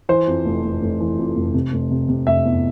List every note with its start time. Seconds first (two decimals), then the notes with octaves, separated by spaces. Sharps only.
0.09 E3 C5
0.27 F2
0.45 F1
0.64 F1
0.82 F1
1.00 E3
1.19 F2
1.36 F1
1.54 C3
1.72 F1
1.91 C3
2.09 C3
2.27 F1 E5
2.45 E2